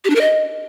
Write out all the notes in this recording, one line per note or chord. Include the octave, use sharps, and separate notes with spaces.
G4
D4
A#4
D#5